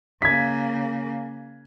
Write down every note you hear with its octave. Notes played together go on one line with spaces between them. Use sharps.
C#3 A#3 G#6 B6